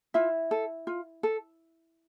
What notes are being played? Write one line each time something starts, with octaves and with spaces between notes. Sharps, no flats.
E4 F4 E5
A4
F4
A4